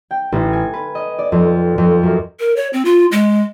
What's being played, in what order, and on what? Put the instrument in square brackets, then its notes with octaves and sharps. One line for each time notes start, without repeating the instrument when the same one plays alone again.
[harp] G5
A1
G#5
B4
D#5
D5
F2
F2
F#2
[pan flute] A#4
C#5
C4
F4
G#3